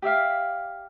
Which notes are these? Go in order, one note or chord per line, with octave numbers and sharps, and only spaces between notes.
G4 D5 E5 F5